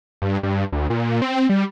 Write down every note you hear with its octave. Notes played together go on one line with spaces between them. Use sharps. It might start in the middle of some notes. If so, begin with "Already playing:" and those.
G2
G2
D2
A#2
C4
G3